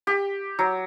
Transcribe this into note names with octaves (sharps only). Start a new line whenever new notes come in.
G4
F#3